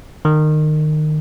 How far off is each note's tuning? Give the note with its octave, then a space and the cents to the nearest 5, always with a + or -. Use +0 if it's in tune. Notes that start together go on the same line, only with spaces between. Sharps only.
D#3 -25